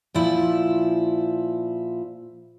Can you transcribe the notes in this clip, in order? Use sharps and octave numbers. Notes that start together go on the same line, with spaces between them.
A#2 F3 E4